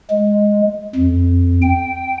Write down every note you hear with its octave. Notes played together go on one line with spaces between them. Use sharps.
G#3
F2
G5